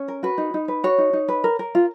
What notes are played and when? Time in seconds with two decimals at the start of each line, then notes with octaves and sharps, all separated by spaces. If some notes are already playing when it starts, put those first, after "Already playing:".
Already playing: C#4
0.08 A#4
0.23 F#4 B4
0.38 D#4
0.54 D#4
0.68 B4
0.84 F#4 C#5
0.98 D#4
1.13 D#4
1.28 B4
1.44 A#4
1.59 A#4
1.75 F4